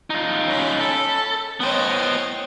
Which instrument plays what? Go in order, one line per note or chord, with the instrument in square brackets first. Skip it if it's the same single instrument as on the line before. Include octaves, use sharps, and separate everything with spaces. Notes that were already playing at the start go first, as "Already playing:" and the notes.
[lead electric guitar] D#4 F4
[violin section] C#4 B5
[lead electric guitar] A4
[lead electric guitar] B3 C5 [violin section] C#5 D#5 G5